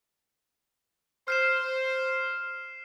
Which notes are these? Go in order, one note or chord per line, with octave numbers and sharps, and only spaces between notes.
C5 F6 C7 E7